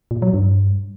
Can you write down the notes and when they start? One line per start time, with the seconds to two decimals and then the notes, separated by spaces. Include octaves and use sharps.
0.11 A#2
0.22 F#3
0.34 G2